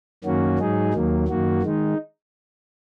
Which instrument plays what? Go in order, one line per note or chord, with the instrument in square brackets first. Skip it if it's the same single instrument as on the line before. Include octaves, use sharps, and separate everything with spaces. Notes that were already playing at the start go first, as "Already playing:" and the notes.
[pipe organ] F#2 D#3 A#3 C#4 F#4
G#2 F#3 D#4 G#4
D#2 D#3 F#3 A#3
F#2 D#3 A#3 F#4
D#3 G#3 D#4